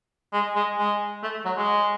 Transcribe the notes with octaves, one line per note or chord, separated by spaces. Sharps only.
G#3
G#3
G#3
A3
F#3
G#3